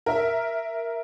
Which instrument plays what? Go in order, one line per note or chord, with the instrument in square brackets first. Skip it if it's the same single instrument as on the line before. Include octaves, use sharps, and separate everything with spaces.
[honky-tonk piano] A#4 E5